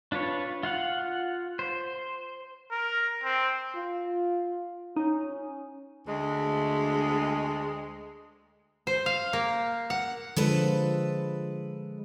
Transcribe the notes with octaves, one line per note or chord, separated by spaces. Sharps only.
D4 F4 B4 C#5
F4 F5 F#5
C5
A#4
C4
F4
C#4 D#4
D2 G#3
C5
F5
A#3
F#5
D3 F3 G#3 A4 B4